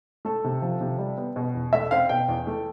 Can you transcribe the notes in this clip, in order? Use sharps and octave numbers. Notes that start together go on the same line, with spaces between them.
A3 A4
C3
F3
C3
G3
B3
B2
E2
A3 E5
C4 F5
B2 G5
E2
A3